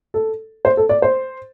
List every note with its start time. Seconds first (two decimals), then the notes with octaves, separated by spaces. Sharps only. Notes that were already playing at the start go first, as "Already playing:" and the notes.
0.14 A4
0.65 C5
0.77 A4
0.89 D5
1.02 C5